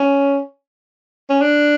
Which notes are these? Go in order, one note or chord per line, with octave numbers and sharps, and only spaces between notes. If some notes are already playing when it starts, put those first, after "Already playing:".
Already playing: C#4
C#4
D4